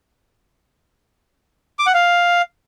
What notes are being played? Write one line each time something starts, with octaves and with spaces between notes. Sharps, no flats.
D6
F#5
F5